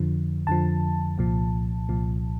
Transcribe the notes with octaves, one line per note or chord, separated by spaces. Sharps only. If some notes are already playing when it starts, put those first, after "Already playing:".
Already playing: F2 D3 F3
F2 D3 F3 A5
C2 A#2 F3
C2 A#2 F3